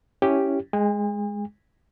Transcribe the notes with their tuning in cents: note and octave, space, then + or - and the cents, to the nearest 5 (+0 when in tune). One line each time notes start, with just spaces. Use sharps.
C#4 +0 E4 +0 G4 +0
G#3 +0 G#5 -45